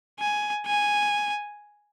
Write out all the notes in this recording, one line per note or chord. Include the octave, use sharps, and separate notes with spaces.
G#5
G#5